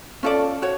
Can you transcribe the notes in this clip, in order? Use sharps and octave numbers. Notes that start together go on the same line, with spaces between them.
C#4 F4 A4 D5
F#4 C#5